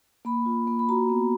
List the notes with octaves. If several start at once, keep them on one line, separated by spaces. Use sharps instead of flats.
A#3 B5
F4
A#3
B5
F#4 A#5
B3